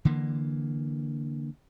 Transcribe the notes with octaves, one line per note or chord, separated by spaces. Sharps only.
D3 E3 A#3